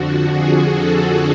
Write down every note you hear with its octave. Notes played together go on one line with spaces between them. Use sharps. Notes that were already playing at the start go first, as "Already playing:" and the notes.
Already playing: F2 D3 F3 F#4
G#4
A4